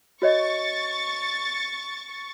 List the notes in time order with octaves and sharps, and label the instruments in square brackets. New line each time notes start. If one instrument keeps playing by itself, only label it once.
[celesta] F#4 C#5 D#5 [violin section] C#6 A6